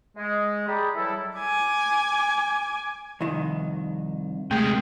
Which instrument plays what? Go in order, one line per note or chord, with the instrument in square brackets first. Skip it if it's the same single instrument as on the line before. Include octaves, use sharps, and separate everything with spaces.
[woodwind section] G#3
G4 G#4 D5 G5 A#5 B5
E3 F#3 G3 E4 A4
[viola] G#5 D6
[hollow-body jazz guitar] C2 F2 D#3
[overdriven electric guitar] C3 G#3 [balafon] A3